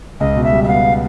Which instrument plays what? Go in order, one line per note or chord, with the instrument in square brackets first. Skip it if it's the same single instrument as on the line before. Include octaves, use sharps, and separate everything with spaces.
[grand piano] C#2 [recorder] D#5
[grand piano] B2
[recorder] E5
[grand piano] G3
[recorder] E5
[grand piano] B3 [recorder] F5